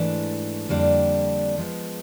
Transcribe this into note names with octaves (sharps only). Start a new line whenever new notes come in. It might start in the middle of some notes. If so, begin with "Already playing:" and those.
Already playing: G#2 E3 A3 D4
F2 D3 G3 A#3 D4
F3 G#3 B3